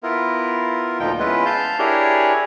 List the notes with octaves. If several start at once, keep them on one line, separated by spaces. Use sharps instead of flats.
B3 E4 F4 A#4
D2 A#2 F3 D#4 G5
G#3 B3 C#4 E4 F4 B4
F5 A5 G6
D4 E4 G4 G#4 A#4 C#5